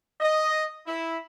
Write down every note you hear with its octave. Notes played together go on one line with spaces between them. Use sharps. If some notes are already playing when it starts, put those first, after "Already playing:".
D#5
E4